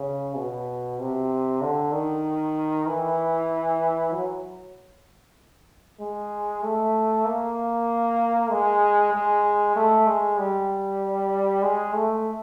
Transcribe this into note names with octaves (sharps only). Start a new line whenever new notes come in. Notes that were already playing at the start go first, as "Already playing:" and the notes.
Already playing: C#3
B2
C3
D3
D#3
E3
F#3
G#3
A3
A#3
G#3
G#3
A3
G#3
G3
G#3
A3